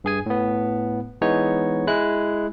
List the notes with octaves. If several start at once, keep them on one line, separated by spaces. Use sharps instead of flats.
G2 G#4 G#5
A2 B3
E3 G#3 B3 D#4 C#5
G#3 E4 F#6